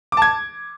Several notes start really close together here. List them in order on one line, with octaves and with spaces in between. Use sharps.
D6 A5 G#6